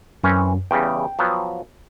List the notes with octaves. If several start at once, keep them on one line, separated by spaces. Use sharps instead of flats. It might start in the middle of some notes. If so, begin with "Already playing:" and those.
F#2 E3 C4 C#4
E2 C#3 G3 G5
F3 F#3 B3